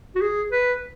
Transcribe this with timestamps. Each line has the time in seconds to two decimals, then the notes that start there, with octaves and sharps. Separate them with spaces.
0.15 F#4
0.21 G#4
0.52 B4